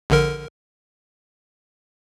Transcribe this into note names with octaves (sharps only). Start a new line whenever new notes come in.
A#1 D3 A#4